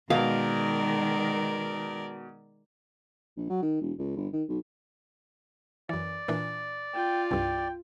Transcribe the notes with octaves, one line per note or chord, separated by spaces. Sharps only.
B2 D#3 G#3 A#4 D5 F5
A#1
F#3
D#3
E1
C#2
G1
D#3
B1
F#2 E3 D5
A#2 E3 D4
F4 G5
C2 G2 G5